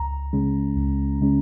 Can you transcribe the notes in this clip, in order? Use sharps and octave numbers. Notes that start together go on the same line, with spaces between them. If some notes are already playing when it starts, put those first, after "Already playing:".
Already playing: C#2 A#5
C#3 G#3 C#4
C#2
C#3 G#3 C#4